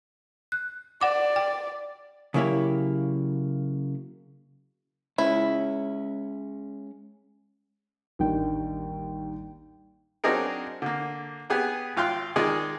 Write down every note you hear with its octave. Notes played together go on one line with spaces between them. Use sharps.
F#6
D5 F#5 D6
G5
C#3 F#3 A#3 E4 G4 C#5
G#3 C#4 E4
A1 D#2 D#3 G3 D4 G5
F#3 C4 D4 D#4 G#4 A#4
D3 A#3
B3 G4 G#4 B4
G#1 F4 F5 G5 C6 F#6
D#3 G#3 F4 G#4 D5